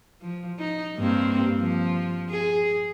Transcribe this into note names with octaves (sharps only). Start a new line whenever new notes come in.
F3
D#4
G2 A#3 C4
F3
G#4